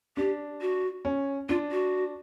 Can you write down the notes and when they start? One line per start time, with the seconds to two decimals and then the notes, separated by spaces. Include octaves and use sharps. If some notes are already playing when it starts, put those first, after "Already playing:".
0.17 D4 G4
0.61 F#4
1.05 C#4
1.49 D4 F4
1.71 F#4